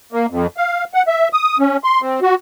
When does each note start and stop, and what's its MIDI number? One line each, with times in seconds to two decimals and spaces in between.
0.13 0.26 58
0.30 0.47 41
0.57 0.84 77
0.94 1.03 78
1.08 1.28 76
1.33 1.58 87
1.59 1.77 61
1.84 2.01 84
2.02 2.20 60
2.22 2.35 66